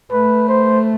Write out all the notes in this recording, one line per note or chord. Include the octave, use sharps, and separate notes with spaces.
A3 B4
C5